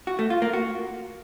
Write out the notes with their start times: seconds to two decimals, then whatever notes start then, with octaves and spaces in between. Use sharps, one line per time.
0.07 F#4
0.19 A3
0.30 F4
0.42 A#3
0.53 F#4